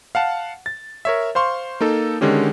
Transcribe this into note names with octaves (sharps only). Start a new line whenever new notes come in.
F5 F#5 A5
A6
A#4 C#5 E5
C5 F5 C6 C#6
A#3 D#4 A4
D3 D#3 G#3 C#4 G4